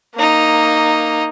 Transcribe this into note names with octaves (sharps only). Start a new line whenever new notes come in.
A#3 D#4